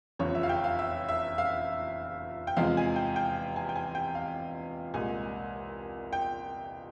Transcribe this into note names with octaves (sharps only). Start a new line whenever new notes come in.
F1 E2 C#3 F3 C#5
E5
F5
G5
F5
E5
E5
F5
G5
E2 C3 F3 G#3 F5
G#5
G5
G5
G#5
G5
G#5
G5
F5
C2 A#2 G#3 G#5
G5